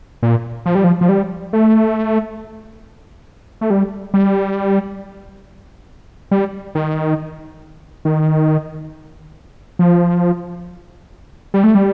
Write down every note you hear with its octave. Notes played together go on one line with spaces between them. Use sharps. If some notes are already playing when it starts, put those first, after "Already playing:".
A#2
F3
G3
F3
F3
G3
A3
A3
G3
G3
G3
D#3
D#3
F3
G3
A3
G3